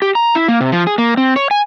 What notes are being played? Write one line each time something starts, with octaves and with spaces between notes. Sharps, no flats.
G4
A#5
E4
A#3
C3
F3
G#4
A#3
C4
C#5
G#5